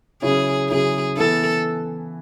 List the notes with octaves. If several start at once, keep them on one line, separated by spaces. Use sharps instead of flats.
C#3 F#3 C#4 E4 G#4
C#3 F#3 C#4 E4 G#4
E3 B3 E4 A4